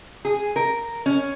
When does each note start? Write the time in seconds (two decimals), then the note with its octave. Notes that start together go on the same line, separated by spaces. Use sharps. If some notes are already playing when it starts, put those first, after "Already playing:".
0.25 G#4
0.56 A#4
1.06 C#4